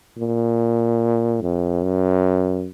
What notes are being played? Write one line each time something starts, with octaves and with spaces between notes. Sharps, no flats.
A#2
F2
F#2